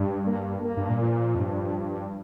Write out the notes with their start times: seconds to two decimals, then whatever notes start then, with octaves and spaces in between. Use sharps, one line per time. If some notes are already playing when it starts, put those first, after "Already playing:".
Already playing: G2 G3
0.27 A#3
0.64 A#3
0.77 G2
0.89 A#2
1.02 F3
1.35 F2
1.39 G2